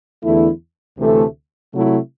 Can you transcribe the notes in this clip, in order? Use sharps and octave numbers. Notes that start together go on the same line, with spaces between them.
E2 D3 A3 E4
D2 C3 E3 A3
C3 F#3 A3 E4